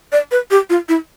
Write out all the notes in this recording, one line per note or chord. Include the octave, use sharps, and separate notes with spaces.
D5
B4
G4
F4
E4